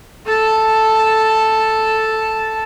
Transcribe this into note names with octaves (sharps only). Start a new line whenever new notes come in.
A4 A5